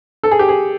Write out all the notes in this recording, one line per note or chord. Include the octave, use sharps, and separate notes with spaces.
A4
G#4
G4
G#4